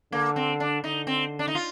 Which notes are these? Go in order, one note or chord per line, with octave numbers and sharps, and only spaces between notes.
D3 A#3
C4
D4
D3 D#4
C4
D4
D#4
F4